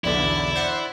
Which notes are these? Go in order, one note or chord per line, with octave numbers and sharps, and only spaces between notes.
B1 E2 D3 E4 D5
C5 F#5